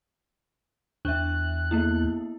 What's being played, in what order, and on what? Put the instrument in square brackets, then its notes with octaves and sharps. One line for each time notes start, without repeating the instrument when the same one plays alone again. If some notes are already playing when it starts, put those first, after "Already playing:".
[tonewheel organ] E2 F#6 [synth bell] D4 E5
[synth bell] A#3 B3 E4